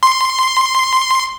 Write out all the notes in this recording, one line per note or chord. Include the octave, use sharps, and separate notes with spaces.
C6